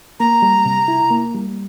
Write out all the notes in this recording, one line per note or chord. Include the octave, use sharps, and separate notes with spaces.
A#3 A#5
G3
C3
E4
A#3
G3